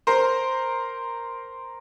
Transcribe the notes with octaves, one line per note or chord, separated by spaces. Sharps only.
A#4 C5